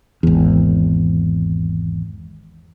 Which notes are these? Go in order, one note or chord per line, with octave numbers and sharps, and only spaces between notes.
G#1 E2